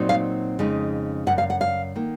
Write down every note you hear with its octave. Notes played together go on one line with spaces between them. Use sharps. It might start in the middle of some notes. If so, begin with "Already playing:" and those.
Already playing: A#2 F#3 C4 D#4
F5
F2 C#3 G#3 D#4
F#2 C#3 F#5
F5
F#5
F5
D#3 A#3